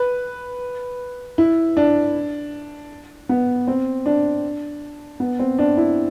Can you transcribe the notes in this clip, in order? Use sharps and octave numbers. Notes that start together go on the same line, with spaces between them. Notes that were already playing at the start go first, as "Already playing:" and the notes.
Already playing: B4
E4
D4
B3
C4
D4
B3
C4
D4
E4